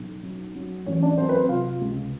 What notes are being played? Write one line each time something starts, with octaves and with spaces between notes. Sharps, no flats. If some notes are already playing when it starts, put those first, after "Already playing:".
Already playing: B1 A2
F#3
F#3
A1 C#4 C#5
D4 D5
F#3 C4 C5
B4
C4 C5
C3 F4 F5
C#2